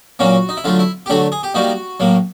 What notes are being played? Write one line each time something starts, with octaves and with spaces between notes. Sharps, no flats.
A#2 F#3 A#3 C#4 F#4
D#4
E4
D3 F#3 A3 F4
E4
G4
D3 F#3 A3 D4 F#4
G#4
G4
D#3 G3 A#3 D#4 F#4
A2 F#3 A#3